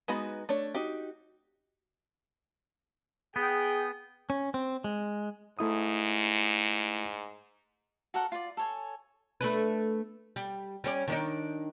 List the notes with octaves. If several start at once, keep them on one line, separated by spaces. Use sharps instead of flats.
G#3 B3 D#4 F#4 B5
A3 D4 C#5
D#4 F#4 G4
B3 G#4 G5
C#4
C4
G#3
G#2 A3 E4 D#6
F#4 A4 A#4 F#5
F4 D5
A4 C#5 G#5
A3 D4 B4
G3
G3 C#4 D5
D#3 D4 D#4